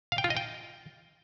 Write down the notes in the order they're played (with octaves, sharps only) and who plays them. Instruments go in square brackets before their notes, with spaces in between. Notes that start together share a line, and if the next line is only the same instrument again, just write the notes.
[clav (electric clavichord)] F5
G5
F4
D#5
G5